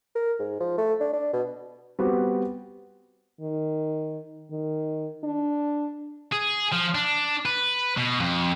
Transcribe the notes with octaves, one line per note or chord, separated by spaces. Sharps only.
A#4
G#2
F3
A3
D4
D4
B2
G3 B3 C4 F#4 G4
D#3
D#3
D4
G#4
F3
D4
B4
B2
F2